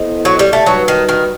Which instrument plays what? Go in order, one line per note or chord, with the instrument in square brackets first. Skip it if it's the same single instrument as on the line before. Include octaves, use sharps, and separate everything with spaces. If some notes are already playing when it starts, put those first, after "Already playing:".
Already playing: [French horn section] B3 E4 A4 C5 D#5
[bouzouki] F#3
G3
A3
[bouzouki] F#3 [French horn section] G3 D#4 F#4 B4
[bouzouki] D#3
D#3